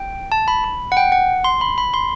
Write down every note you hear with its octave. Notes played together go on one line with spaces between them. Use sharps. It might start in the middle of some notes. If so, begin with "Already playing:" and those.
Already playing: G5
A5
B5
B5
F#5
G5
F#5
C6
B5
B5
C6